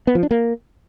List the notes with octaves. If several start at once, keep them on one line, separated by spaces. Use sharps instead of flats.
B3
F3
D4
A#3